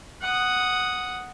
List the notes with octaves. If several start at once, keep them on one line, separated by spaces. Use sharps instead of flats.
F#5 D#6